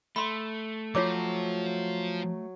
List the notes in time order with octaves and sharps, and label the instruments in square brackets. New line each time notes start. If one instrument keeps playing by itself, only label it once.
[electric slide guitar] A3 [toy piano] B5 C6
[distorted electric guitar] F3 [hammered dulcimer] F#3 [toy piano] F4 C#5 D6